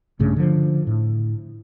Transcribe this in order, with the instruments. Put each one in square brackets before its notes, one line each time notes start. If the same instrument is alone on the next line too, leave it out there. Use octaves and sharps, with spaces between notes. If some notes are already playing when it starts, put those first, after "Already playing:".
[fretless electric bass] A#1 G2 C#3 A3
D3 F3
A2